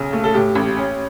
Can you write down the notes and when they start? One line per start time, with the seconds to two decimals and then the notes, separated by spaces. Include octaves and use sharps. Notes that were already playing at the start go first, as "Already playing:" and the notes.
Already playing: B1 C#3
0.13 A3
0.24 A4
0.34 A2 G4
0.55 A1
0.77 C#4